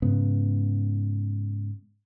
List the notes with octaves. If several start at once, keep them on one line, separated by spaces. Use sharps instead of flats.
G#2 C#3 B3